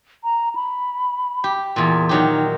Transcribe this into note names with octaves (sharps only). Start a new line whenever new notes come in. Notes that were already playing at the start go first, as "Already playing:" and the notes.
A#5
B5
G4
E2 A#2
D#3 F#3 D#4 G4